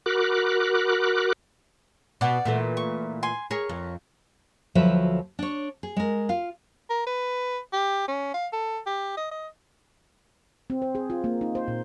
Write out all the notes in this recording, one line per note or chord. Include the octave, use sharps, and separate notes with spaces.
F#4 A#4 B5 D6 F#6
B2 D5 F#5
A#2 E3 A3
C#6
G#5 C6
G#4 A#4 C#5
F2
D2 F3 F#3 A4 B4 E5
D4 C#5
G#4
G#3 A#4
F4 F5
A#4
B4
G4
C#4
F5
A4
G4
D#5
D#5
C4
C5
G#4
F4
A#3
D#4
C5
A#2